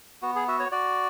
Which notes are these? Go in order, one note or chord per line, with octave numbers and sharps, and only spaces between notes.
B3 F#4
G#4
F#4 E5
C#5
F#4 D5